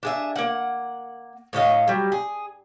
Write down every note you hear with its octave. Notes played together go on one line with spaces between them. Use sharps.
D4 G#4 E5
A#3 F#5
A2 C#5 D#5 F5
F#3 G3
G#4